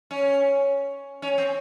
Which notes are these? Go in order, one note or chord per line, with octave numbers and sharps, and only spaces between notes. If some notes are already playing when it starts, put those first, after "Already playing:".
C#4
C#4
C4